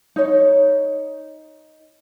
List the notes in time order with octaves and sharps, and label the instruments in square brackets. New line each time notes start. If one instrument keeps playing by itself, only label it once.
[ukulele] D#4 C#5